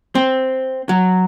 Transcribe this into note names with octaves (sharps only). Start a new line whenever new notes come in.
C4
F#3